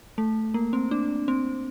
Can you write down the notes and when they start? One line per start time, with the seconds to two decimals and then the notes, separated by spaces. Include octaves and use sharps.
0.18 A3
0.54 A#3
0.73 C4
0.91 D4
1.28 C4